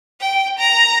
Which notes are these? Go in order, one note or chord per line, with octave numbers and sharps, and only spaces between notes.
G5
A#5